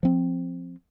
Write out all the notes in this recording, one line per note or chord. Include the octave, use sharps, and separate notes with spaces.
F3 C4